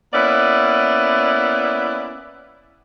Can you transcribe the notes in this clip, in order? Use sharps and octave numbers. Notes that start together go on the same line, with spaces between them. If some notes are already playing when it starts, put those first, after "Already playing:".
A#3 B3 C#4 E4 B4 D5